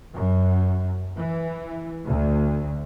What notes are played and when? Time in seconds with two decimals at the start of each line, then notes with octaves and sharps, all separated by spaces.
0.15 F#2
1.17 E3
2.06 D2